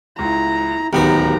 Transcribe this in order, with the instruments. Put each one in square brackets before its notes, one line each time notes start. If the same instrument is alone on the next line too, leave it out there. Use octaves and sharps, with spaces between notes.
[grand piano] C#2 [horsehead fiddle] E4 A#5
[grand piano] D1 G4 A#4 [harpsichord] D#2 B3 F#4 [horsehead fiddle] D#4 A#5